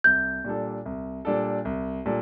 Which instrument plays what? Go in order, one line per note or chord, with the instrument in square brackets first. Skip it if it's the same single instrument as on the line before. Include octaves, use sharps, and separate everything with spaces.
[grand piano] C2 [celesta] G6
[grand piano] A#2 G3 D4 A4
C2
A#2 G3 D4 A4
C2
A#2 G3 D4 A4